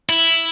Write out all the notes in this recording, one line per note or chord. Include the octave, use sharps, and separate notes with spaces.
E4